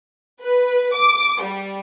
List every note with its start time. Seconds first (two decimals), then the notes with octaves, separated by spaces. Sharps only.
0.41 B4
0.94 D6
1.42 G3